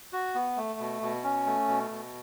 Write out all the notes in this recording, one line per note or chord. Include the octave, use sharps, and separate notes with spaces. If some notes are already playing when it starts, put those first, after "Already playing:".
F#4
B3
A3
B2
B2
C#4
A3
B2
B2